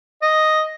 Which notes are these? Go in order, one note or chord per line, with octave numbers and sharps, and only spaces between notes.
D#5